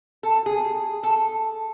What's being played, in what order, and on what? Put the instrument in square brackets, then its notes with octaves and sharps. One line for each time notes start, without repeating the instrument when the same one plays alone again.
[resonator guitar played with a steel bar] A4
G#4
A4